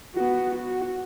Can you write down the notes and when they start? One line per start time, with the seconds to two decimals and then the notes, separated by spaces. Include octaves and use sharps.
0.15 B3 F#4
0.55 F#4